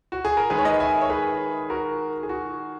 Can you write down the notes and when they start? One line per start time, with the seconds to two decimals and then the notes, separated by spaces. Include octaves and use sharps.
0.12 F#4
0.25 G#4
0.37 A#4
0.50 D#3 G#3 G#4 B4
0.58 C#5
0.64 B4 D#5
0.80 E5 G#5
1.02 C#5
1.10 G#4 B4
1.70 F#4 A#4
2.23 G#4
2.29 F#4